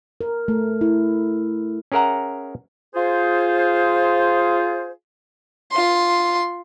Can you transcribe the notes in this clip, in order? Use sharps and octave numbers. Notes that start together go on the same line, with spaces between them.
A#4
A3
E4
C#4 G#4 A#4 E5 F#5 A#5
F4 G#4 C5
F4 C6